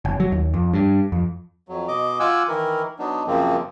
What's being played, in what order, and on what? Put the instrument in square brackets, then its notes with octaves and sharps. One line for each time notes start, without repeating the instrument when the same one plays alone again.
[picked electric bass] F#1
F#3
D#2
F2
G2
F2
[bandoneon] F2 F#3
B2 D#5 D6
F4 F#5 G#5 D6 E6
D#3 E3 E4 A#4
F#3 B3 D4 D#4
F#2 C#3 F3 A#3 C4